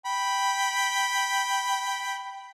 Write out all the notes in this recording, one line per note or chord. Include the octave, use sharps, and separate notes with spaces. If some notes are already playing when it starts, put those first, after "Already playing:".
G5 B5